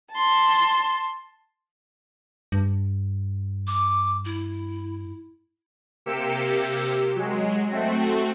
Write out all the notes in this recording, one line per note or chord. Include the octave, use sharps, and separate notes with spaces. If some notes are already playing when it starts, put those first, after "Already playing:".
A5 C6
G2
D6
E4
C3 A#3 G4 E6 C#7
F#3 G#3
A3 C4 F#4